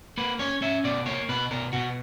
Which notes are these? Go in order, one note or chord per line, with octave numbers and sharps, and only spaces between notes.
A#3 B4
C#4 C#5
C#4 E5
B2 D5
A#3 C#5
B2 B4
B2 A#4
B2 F#4